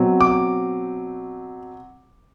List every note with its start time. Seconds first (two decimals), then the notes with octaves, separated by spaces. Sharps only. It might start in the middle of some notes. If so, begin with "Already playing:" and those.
Already playing: B2 F#3 C4
0.21 D6